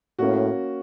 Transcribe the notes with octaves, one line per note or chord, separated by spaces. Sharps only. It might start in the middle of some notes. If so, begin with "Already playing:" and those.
A2 A#3 C#4 F#4